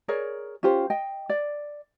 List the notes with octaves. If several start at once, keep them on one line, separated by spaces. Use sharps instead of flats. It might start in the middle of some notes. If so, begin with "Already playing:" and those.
G#4 A#4 C#5 D5
C#4 F4 G4 C5
D#5 G5
D5